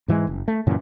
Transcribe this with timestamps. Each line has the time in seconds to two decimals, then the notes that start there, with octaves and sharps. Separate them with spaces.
0.08 G#2 E3 F3 G#3
0.27 F#1
0.48 A3
0.67 F#2 A#2 C#3 E3